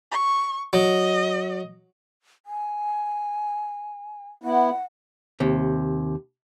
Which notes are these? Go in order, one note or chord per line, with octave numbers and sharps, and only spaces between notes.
C#6
F#3 D#5
G#5
B3 E4 F#5
D#2 C3